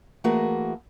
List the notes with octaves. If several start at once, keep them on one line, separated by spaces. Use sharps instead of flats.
E3 A3 A#3 F#4 G#4 A#4